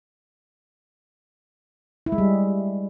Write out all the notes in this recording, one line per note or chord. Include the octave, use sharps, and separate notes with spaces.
E4
G#3
G3